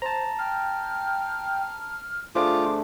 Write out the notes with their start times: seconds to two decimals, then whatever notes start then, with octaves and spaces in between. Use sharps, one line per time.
0.02 C5 A5 A#5
0.39 G5 F6
2.35 A3 D4 F4 G#4 C5 D6